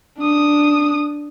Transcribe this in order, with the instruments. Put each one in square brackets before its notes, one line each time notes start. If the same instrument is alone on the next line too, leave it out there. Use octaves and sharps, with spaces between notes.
[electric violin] D4 D#6